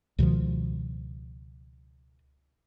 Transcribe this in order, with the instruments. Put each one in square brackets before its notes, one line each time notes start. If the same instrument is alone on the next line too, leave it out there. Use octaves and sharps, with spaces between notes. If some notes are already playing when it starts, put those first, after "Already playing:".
[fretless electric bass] C#2 B2 D#3 F3